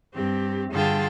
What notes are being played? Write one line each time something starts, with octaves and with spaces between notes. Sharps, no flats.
G2 C4 G4
G2 D3 F4 G#4 G5 A5